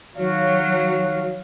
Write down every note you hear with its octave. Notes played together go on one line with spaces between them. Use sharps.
D#3 F#3 F#4 C#5 F5